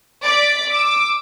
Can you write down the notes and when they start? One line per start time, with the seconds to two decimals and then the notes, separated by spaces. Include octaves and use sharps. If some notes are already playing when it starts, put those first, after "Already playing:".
0.24 D5 B6
0.70 D6 E6